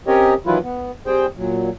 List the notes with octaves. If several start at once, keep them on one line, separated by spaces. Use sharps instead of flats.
C4 C#4 G4 A#4 C#5 D#5
D#3 E3 F#3 E4 F4 B4
B3
G3 C4 G#4 C5 G5
A#2 F#3